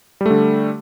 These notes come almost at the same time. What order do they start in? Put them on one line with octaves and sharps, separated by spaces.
G3 A3 D3